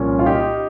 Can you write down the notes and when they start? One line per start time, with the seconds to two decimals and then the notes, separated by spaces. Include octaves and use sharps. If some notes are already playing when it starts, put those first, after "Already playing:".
Already playing: C2 A#2 F3 C#4
0.19 F4
0.26 D#4 G4